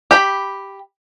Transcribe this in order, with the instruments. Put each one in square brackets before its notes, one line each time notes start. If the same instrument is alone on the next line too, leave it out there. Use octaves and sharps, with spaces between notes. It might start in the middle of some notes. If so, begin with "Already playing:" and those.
[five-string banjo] G4 B5